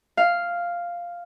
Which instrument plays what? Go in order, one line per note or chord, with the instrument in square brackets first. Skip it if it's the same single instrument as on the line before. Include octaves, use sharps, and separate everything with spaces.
[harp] F5